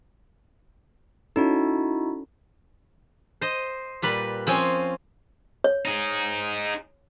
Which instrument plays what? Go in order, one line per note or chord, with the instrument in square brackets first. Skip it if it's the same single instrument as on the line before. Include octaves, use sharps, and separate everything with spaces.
[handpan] C#4 A4 [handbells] D#4 E4 F#4
[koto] C5 D#5
A#2 G3 B4
F3 C4 C#4 G#5
[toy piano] C#5
[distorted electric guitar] D#4 G#4